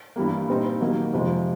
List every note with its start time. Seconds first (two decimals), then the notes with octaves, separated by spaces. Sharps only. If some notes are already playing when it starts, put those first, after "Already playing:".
0.16 G2 E3 G3 A#3
0.48 A#2 G3 C4 D#4
0.80 D#3 F#3 A#3 D#4 G4
1.13 F2 C3 F3 G#3